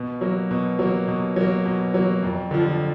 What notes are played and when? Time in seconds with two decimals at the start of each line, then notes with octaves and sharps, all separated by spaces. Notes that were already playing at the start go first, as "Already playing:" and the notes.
Already playing: B2
0.21 F#3 A#3
0.51 B2
0.79 F#3 A#3
1.08 B2
1.36 F#3 A#3
1.65 B2
1.94 F#3 A#3
2.23 F2
2.51 D3 F3